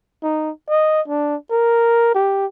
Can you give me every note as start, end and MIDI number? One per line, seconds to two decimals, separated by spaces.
0.23 0.51 63
0.69 1.01 75
1.08 1.35 62
1.50 2.12 70
2.14 2.46 67